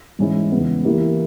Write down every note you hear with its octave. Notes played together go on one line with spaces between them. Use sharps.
G#2 E3 G#3 C#4 E4
E2 C#3 G#3 B3
E3 A#3 E4 G4 A#4